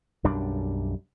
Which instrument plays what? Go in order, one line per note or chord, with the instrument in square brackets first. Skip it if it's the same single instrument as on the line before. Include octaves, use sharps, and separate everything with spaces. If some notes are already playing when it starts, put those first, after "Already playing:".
[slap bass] B1 F#2 G3 D4